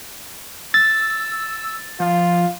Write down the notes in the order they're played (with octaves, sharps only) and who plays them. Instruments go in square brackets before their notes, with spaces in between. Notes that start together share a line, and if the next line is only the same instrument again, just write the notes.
[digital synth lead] E6 [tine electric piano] A6
[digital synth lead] F3 [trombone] F4